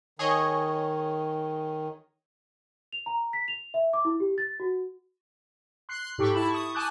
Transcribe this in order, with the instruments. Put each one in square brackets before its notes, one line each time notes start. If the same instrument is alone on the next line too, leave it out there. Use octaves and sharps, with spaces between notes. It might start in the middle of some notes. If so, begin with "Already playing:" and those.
[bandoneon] D#3 [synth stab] G#4 C#5 D#5
[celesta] F7
A#5
B6
F7
E5
D6
E4
G4
A6
F#4
[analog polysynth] C6 F#6 C7
G#2 G4 A4 G5 C#6
E4 A5 B5
C#6 D#6
G#5 A5 D6 D#6 F#6 G6